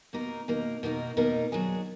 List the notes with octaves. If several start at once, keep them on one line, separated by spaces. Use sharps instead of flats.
B2 A#3 D#4 A#4
B2 A#3 D#4 A#4
B2 A#3 D#4 A#4
B2 A#3 D#4 A#4
F#3 D4 G#4